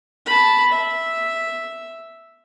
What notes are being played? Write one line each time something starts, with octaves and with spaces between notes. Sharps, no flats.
A5 B5
E5